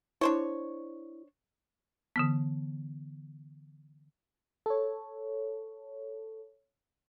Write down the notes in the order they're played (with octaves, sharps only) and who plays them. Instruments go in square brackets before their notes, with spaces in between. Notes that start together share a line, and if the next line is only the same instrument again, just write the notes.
[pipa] D4 C5 C#5 [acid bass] E4
[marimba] D3 E3 B3
[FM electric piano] A4 C#5